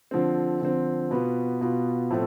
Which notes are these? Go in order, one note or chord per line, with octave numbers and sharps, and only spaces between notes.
D3 F3 C4
D3 F3 C4
B2 B3 F4
B2 B3 F4
A2 F3 A3 C4